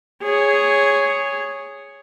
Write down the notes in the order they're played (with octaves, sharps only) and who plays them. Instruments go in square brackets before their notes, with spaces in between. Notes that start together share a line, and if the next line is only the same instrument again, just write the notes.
[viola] G#4 C#5